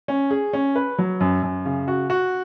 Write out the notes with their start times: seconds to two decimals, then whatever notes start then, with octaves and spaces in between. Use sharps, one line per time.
0.08 C#4
0.31 G#4
0.53 C#4
0.76 B4
0.98 F#3
1.20 F#2
1.43 F#2
1.65 C#3
1.88 F#4
2.10 F#4